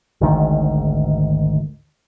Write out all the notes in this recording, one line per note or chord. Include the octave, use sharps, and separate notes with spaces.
G#1 D2 G#2 D#3